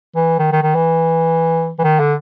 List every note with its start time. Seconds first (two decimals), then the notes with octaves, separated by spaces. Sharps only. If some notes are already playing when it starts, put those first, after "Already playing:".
0.16 E3
0.39 D#3
0.52 D#3
0.63 D#3
0.75 E3
1.79 E3
1.84 D#3
2.00 D3